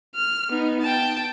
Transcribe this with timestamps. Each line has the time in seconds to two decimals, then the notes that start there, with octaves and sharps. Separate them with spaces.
0.16 F6
0.50 B3 D#4
0.82 G5 A5